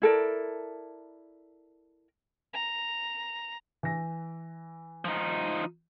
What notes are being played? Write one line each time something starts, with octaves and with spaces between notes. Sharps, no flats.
E4 A4 A#4 D5
A#5
E3 A#6
F3 D#4